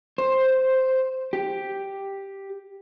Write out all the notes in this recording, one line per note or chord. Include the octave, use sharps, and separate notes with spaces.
C5
G4